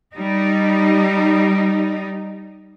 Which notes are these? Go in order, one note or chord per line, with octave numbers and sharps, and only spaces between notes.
G3 D#4